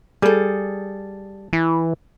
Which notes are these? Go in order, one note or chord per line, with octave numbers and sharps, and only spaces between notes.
G3 G#4 A4
E3